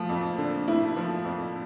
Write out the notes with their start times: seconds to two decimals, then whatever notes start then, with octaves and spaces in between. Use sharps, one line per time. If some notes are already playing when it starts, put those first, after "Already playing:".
Already playing: F3 A3
0.09 F2
0.38 D3
0.68 A3 E4
0.97 F3
1.25 F2